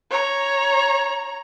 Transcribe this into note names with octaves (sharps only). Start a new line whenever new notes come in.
C#5 A#5